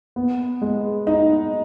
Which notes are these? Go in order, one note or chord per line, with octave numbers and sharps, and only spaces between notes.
B3
G#3
D#4